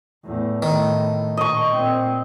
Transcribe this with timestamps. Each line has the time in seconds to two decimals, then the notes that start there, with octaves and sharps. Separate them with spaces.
0.25 E2 A2
0.62 A2 D#3
1.37 A#2 D#5 C#6
1.73 A#2 C4